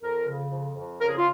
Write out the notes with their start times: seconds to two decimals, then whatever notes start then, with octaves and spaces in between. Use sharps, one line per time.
0.02 F2 A#4
0.28 C#3
0.51 F2
0.76 F2
1.00 C#3 A#4
1.08 G#4
1.18 F4